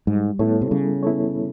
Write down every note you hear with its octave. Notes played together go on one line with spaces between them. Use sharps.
G#2 G3
A2 B3 E4 A4 C#5
C3
C#3 G3
B3 E4 A4 C#5